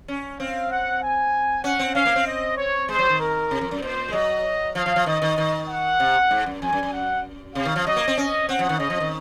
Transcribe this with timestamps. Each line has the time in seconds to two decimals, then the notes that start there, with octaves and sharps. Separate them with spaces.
0.08 C#4
0.39 C4 F5
0.71 F#5
1.02 G#5
1.64 C#4 F#5
1.79 C4
1.95 C#4 F5
2.05 A#3
2.16 C4
2.26 D#5
2.57 C#5
2.89 G#3 C5
2.99 F#3
3.09 D#3
3.19 A#4
3.51 C3
3.61 F2
3.71 F#2
3.81 A#2 C5
4.08 G#3
4.13 F#3 D#5
4.75 F3 F5
4.86 F3
4.96 F3
5.06 D#3 D#5
5.22 D#3
5.38 D#3
5.68 F#5
6.00 C3
6.31 G#2
6.46 F#2
6.61 F2 G#5
6.73 F#2
6.83 F#2
6.93 F#5
7.55 C3 F5
7.65 D#3
7.76 F3
7.86 F#3 D#5
7.96 A#3
8.08 C4
8.17 C#4 D#5
8.48 C4 F#5
8.59 F3
8.69 D#3
8.79 C#3 D#5
8.90 F3
9.00 D#3